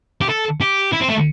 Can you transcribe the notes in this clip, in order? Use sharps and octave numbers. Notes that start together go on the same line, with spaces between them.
G4
A4
G4
E4
C4
A3